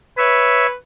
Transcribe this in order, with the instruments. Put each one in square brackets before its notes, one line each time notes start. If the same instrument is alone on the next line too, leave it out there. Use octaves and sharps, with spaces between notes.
[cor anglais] B4 [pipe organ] C#5 E5